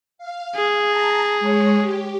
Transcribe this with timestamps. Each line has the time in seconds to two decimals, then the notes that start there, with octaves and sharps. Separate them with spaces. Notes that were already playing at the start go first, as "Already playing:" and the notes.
0.18 F5
0.56 G#4
0.86 A5 A#5
1.39 G#3 C#5
1.80 G4